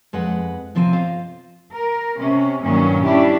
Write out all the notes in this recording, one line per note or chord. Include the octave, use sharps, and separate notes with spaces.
F2 G#3 B4 F#5
C3 F3 C4 E5 F5 G#5
F4 C5 D#5 F5
A#4
C3 C#4
G2 A#2 D#3 F#3 C#4
G3 C#4 D4 E4 G4